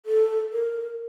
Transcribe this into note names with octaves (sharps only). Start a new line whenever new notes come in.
A4
A#4